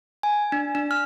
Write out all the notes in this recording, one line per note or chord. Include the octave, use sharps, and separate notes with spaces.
G#5
D4
D4
F6